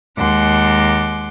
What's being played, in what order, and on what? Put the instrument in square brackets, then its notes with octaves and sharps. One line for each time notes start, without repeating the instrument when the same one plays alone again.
[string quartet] D#2 G#3 F#5 C6 D6